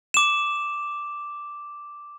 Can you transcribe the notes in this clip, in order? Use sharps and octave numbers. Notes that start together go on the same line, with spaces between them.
D6 E7